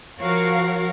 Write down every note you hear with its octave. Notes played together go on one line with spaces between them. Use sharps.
F3 F#4 A#4 C#5 F5